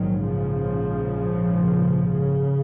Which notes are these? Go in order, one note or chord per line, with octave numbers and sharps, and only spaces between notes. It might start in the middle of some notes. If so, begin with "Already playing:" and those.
Already playing: A#1 G#2 D#3 F#3
C#3 F3
C#3